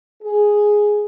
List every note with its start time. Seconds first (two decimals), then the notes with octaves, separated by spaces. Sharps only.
0.22 G#4